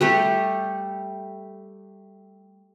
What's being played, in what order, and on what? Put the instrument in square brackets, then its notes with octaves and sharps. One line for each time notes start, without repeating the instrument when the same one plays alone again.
[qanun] G3 A3 G4